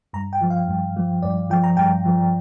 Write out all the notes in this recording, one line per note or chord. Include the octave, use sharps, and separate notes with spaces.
G2 A#5
G5
F3
F5
G2
F3
G2 D5
F3 G5
A#5
G2 G5
F3